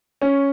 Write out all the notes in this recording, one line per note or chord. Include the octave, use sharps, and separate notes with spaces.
C#4